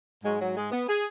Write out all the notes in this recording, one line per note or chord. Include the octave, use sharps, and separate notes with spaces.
G#2 F#3 G#3
F#3
G#3
B3
G#4